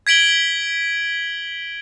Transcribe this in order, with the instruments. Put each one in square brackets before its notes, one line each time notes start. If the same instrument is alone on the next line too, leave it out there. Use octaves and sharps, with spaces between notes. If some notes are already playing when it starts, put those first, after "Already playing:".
[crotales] G#6 B6 D7 F#7 G7